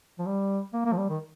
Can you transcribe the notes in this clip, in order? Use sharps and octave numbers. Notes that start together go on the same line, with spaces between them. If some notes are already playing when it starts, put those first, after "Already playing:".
F3
G3
A#3
A#3
F3
G3
D#3